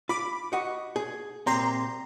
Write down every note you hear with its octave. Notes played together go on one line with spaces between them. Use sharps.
F4 B5 D6
F#4 D#5 F#5
G#4
C2 A#2 C4 A#5 C6